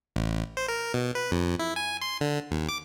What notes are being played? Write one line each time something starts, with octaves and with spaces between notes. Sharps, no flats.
A1
C5
A#4
B2
B4
F2
E4
G#5
C6
D3
D#2
D6